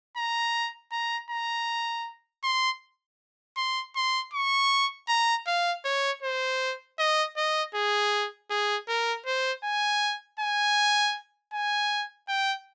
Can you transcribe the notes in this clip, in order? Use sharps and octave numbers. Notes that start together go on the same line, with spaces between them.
A#5
A#5
A#5
C6
C6
C6
C#6
A#5
F5
C#5
C5
D#5
D#5
G#4
G#4
A#4
C5
G#5
G#5
G#5
G5